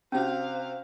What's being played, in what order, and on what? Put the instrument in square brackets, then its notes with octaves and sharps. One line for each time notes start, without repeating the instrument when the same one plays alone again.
[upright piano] C3 F#4 [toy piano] C#4 [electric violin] C5 F5